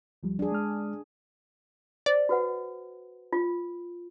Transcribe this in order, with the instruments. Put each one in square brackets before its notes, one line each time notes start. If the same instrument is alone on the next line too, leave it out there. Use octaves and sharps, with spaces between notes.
[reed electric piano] D2 F3 G3
[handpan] D4 G#4
[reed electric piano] G#3 F6
[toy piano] C5 [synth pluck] D5
[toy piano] F#4 B4 F#5
F4